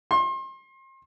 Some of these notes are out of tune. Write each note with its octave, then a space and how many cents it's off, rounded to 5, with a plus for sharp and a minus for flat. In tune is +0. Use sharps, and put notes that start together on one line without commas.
C6 +35